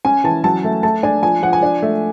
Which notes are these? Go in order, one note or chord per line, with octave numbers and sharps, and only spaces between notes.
C#4 G#5
E3 A5
F#3 A5
A3
A3 A5
D4 G#5
F3 G#5
F3 F#5
G#5
D4
A3